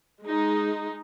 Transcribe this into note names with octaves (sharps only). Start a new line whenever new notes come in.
G#3 D#4